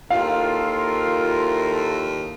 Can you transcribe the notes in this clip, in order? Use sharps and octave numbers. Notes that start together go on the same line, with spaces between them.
D#2 E4 F4 A4 A#4 F5